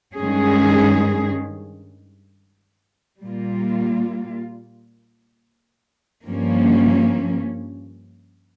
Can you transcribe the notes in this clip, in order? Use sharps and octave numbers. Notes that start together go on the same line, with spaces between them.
G2 D#3 G#3 C#4 G#4
A#2 G3 A#3 F4
G2 F3 A#3 C#4